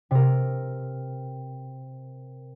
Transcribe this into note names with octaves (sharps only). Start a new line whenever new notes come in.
C3 A#4